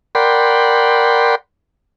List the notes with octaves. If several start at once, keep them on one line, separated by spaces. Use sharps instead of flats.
A#4 D5 F#5 G5 B5 C6